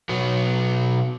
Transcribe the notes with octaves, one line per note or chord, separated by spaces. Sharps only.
B2 F#3 B3